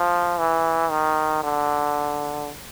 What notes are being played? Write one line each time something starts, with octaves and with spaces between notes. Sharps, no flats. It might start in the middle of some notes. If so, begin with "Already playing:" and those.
Already playing: F3
E3
D#3
D3